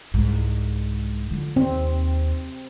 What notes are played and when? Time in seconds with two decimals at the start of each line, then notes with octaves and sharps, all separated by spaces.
0.14 C2 G#2
1.31 D3 F3
1.56 D#2 C4